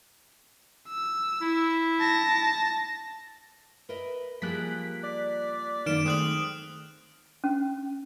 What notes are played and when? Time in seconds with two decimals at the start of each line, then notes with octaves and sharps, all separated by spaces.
0.89 E6
1.41 E4
2.00 A5 A#6
3.89 A#4 B4 D#5 E5
4.42 F3 G3 A#3 G#4 F#6 B6
5.04 D5
5.86 F#2 D#3 A#3 B3 F6 D7 E7
6.06 G#3 A3 C4 G#4 D#6 F#6 F#7
7.44 C#4